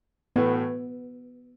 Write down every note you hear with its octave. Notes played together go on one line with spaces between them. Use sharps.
A2 E3 A3 B3 F#4